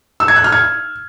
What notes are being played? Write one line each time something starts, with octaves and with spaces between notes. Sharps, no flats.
E6
G#6
F#6
F6
G#6